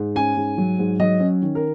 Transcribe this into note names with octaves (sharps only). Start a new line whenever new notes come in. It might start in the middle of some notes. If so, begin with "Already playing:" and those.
Already playing: G#2
C#4 G#5
G#2
F#3
G#2
F#3 D#5
C#4
D#3
A#4